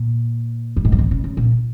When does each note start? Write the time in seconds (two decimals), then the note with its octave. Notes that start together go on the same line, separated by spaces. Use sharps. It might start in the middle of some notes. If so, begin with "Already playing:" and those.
Already playing: A#2
0.77 F#2
0.85 G#2
0.92 F#3
0.99 D#3
1.11 C#3
1.24 C#3
1.37 A#2